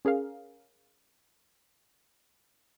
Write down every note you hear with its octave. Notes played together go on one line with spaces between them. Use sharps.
C#4 G#4 A#4 F5